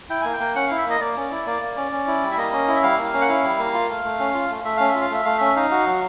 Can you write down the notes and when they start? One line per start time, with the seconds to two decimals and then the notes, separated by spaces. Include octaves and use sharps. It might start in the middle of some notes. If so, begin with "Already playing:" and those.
0.10 E4 G5
0.22 A#3 G#5
0.33 G5
0.40 A#3
0.56 C#4 F#5
0.67 E4 F5
0.78 E5
0.85 A#3 D#5
1.01 A#3 D5
1.17 C#4
1.31 E4
1.46 A#3 D5
1.62 A#3
1.77 C#4
1.92 C#4
2.07 E4
2.22 G3
2.31 E5
2.37 A#3 D#5
2.53 C#4
2.68 E4
2.76 E5
2.83 G3 F5
2.98 A#3
3.13 C#4
3.21 F#5
3.29 E4 F5
3.44 G3
3.59 A#3
3.74 F4
3.89 A3
4.04 A3
4.20 C#4
4.34 F4
4.50 A3
4.65 A3 E5
4.77 C#4 F5
4.88 E5
4.95 F4
5.01 F5
5.10 A3 E5
5.25 A3 F5
5.38 C#4 E5
5.56 D#4 F5
5.71 F#4
5.86 F#3